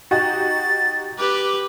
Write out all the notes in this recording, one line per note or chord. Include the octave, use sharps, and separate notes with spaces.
D#4 F#4 G4 A6
G4 B4 D6